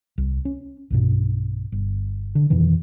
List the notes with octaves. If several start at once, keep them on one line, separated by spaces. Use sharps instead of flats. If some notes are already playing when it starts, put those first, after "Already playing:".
C2
C#4
B1 G2 B2
G1
D3
F2 B2 D#3 E3